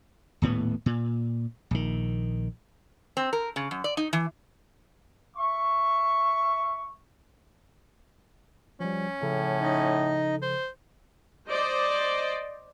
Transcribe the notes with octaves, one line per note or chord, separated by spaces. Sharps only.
D#1 A2 B3
A#2
A#1 D#3
C4
A#4
C#3
F#2
D5
D#4
E3
E5 C#6
F3 G3 C#4
A2 C#3 F3 A4
D#4 D#5
C5
C5 D5 D#5